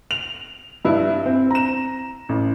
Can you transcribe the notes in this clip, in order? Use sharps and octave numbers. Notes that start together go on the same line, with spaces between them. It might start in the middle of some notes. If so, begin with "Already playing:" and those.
F7
G2 E4
C4
A#5 E7
A1